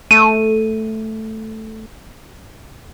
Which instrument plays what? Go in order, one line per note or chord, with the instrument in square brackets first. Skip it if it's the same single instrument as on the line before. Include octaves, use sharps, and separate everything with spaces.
[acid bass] A3 [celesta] D#7